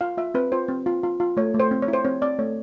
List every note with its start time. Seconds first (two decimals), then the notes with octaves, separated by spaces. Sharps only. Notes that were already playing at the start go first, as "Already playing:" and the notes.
0.01 F4 F5
0.17 F4 E5
0.34 C4 B4
0.52 F4 C5
0.68 C4
0.86 F4
1.03 F4
1.20 F4
1.37 A3 C#5
1.54 A3
1.60 C5
1.71 C4
1.82 C#5
1.88 E4
1.93 C5
2.05 C4 C#5
2.21 C4 D5
2.39 A3 C#5